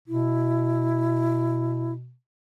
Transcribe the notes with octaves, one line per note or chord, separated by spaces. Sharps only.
B2 E4